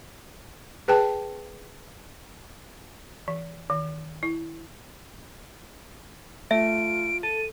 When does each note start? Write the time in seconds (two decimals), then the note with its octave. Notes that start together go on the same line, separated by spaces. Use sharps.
0.88 G#4 B4 G5 A5
3.28 E3
3.70 D#3
4.23 E4
6.51 A3 F4 E5 D7
7.23 A4 D#7